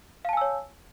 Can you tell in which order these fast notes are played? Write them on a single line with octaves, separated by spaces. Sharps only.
F5 A5 G#5 E6 C#5